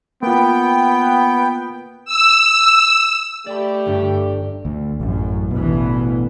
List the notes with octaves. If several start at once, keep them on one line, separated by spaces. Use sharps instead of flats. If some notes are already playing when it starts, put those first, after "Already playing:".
A#3 B3 F4 G5
E6
A3 G4 D5 B5
G1 G2
D2
A1 F#2
A1 D2 B2 E3